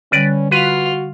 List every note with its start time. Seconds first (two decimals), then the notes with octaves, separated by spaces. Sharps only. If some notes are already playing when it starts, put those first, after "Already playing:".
0.12 D3 G3 C#4 B4 D5
0.52 F4 F#4 B4 F5